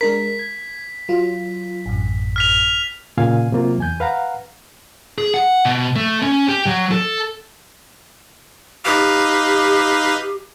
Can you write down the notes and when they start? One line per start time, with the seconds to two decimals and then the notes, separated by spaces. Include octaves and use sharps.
0.01 G#3 D4 A#4 B6
0.39 G#6
1.09 F#3 F4
1.86 A1 F#2
2.36 F6 B6 F7
3.17 A#2 C#3 F5 G#5
3.52 C3 F#3 A#3 F4
3.78 E2 G#5 G6
4.00 B4 F5 F#5 A#5
5.18 G#4
5.34 F#5
5.65 B2
5.96 A3
6.23 C#4
6.49 G4
6.66 F#3
6.92 A4
8.85 D#4 G4 B4 F5